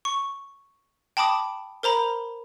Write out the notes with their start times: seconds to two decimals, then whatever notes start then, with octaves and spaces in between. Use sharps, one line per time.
0.05 C#6
1.17 G5 A5 B5 D6 D#6
1.83 A#4 C5 A#5 B5